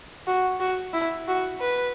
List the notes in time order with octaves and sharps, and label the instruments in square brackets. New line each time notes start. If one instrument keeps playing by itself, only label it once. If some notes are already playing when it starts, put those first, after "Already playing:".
[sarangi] F#4
F#4
E4
F#4
B4